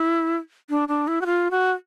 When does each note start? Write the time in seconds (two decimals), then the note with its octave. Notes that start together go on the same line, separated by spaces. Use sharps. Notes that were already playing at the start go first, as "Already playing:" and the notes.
Already playing: E4
0.70 D4
0.88 D4
1.08 E4
1.21 F#4
1.26 F4
1.51 F#4